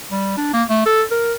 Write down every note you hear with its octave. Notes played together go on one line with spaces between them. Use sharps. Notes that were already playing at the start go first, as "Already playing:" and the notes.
G3
D4
A#3
A3
A4
A#4